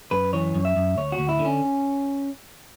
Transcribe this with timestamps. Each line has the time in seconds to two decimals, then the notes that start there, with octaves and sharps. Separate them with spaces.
0.11 F#2 B4
0.33 E3 C#5
0.55 F#2
0.65 E5
0.76 F#2
0.97 D2 C#5
1.12 F#4
1.19 D2
1.29 E4
1.39 D3
1.45 C#4